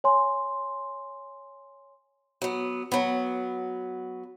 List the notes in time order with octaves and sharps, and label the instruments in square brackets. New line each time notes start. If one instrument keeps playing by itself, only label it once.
[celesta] C#5 G#5 C6
[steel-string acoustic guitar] F#3 B3
F#3 B3